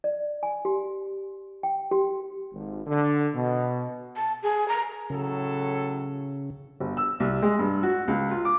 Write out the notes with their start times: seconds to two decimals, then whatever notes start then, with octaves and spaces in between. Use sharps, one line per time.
0.04 D5
0.43 G#5
0.65 G4
1.63 G5
1.91 G4
2.52 G#1
2.87 D3
3.35 B2
4.16 A5
4.43 G#4
4.69 A#5
5.10 A2 C#3 F#3 A4
6.80 G1
6.97 E6
7.20 C2
7.42 G#3
7.59 G2
7.83 F#4
8.08 C#2
8.31 F4
8.45 D6